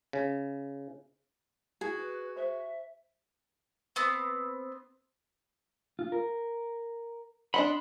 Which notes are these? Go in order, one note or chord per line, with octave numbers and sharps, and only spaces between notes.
C#3
E4 F#4 G#4
B4
C5 E5 C#6
B3 C4
F4
A#4
D4 D#5 F#5 B5 C6